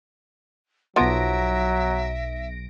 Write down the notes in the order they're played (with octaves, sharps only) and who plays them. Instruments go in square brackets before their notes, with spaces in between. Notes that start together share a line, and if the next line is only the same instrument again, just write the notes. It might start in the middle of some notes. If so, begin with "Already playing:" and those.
[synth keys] B1 A#6 D7 [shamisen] F3 B3 [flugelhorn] F#3 [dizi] E5